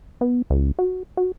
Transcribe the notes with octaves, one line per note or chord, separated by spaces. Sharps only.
B3
C#2
F#4
F#4